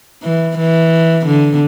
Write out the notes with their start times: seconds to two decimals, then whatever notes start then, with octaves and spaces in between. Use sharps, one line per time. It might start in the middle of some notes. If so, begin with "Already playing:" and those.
0.23 E3
0.58 E3
1.26 D3